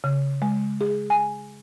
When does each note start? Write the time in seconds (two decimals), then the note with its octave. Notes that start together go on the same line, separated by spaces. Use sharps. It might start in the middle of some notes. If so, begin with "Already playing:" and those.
0.04 C#3
0.42 G#3
0.81 G#4
1.10 G#5